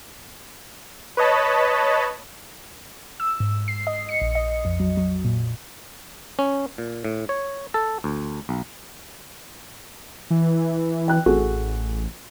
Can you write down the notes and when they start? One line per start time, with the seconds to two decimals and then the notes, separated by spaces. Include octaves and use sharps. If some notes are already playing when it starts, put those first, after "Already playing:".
1.17 B4 C#5 D#5 A5 B5
3.20 E6
3.40 G#2
3.68 C7
3.87 D#5
4.09 C#7
4.22 A#1
4.35 D#5
4.65 F2
4.80 F#3
4.97 F#3
5.25 A#2
6.39 C#4
6.78 A#2
7.05 A2
7.29 C#5
7.74 A4
8.04 D2
8.49 B1
10.30 E3
11.08 G5 F#6
11.26 A1 F#4 G#4 A4